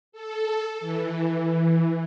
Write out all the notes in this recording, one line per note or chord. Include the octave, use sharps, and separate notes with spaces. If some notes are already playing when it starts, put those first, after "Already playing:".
A4
E3